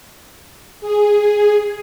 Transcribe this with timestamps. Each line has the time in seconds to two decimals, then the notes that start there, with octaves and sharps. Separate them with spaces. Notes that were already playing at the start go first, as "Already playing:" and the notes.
0.81 G#4